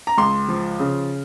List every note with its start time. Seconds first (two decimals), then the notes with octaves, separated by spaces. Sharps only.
0.07 A#5
0.17 C#2 C6
0.48 F3
0.80 C#3